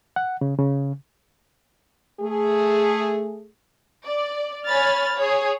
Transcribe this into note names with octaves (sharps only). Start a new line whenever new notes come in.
F#5
C#3
C#3
A3 G#4
D5
C#5 G#5 B5 F6 A6
G#4 C#5